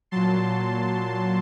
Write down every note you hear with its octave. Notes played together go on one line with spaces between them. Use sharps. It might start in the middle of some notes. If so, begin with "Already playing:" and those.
A#2 F#3 A5 C6